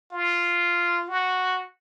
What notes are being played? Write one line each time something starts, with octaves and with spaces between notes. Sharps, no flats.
F4
F#4